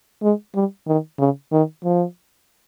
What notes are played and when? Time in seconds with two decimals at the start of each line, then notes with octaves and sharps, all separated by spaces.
0.23 G#3
0.55 G3
0.87 D#3
1.19 C#3
1.52 D#3
1.84 F3